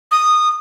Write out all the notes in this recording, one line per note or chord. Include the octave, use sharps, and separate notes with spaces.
D#6